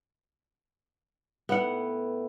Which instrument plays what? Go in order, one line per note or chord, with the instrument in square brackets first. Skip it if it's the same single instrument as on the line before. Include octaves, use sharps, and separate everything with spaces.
[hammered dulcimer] A2 [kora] B3 F#5